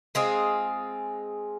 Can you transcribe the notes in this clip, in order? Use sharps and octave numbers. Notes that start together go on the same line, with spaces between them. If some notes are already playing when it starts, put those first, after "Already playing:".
G#3 C4 F4 G#4